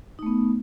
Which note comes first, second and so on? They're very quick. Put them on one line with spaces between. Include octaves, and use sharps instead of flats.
D#4 A3 B3